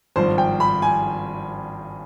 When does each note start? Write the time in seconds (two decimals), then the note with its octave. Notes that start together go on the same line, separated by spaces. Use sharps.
0.16 G#1 G2 F3 C5
0.38 G5
0.60 B5
0.82 G#5